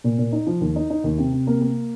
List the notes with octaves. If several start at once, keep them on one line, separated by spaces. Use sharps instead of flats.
A#2
A#2
D#4
F3
D#2
D#4
D#4
D#2
C3
C3
A#3
A#3